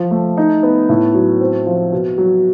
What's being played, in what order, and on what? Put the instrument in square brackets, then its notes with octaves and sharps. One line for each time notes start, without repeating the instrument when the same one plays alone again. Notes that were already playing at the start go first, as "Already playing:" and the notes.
Already playing: [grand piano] F3
A3
D#4
B3
A2
F#3
C4
F3
B2
F#3